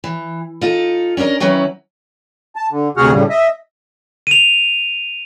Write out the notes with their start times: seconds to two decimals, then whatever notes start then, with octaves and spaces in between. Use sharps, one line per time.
0.04 E3
0.61 D#4 F4 A4
1.17 C#4 D4 G#4 A#4 D#5
1.40 D#3 F#3 C#4 E4 B4
2.56 A5
2.71 D3
2.97 D2 C3 F#4 G#4 F#5 F6
3.12 A2 C#3 G3
3.30 D#5 E5
4.27 D#7 F7